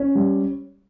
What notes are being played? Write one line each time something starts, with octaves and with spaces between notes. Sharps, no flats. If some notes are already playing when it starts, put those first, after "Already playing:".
Already playing: C#4
G3